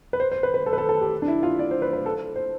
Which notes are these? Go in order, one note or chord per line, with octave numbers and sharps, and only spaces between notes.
B4
C5
C5
B4
B4
A4
B4
A4
A4
G4
D4
E4
F4
D5
C5
B4
B4
A4
C5